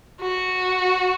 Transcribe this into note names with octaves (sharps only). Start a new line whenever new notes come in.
F#4